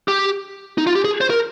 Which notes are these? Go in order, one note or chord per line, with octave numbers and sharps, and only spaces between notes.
G4
D#4
F4
G4
G#4
C5
A#4